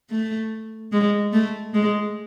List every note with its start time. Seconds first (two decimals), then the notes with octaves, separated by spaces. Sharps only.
0.10 A3
0.92 G#3
1.33 A3
1.74 G#3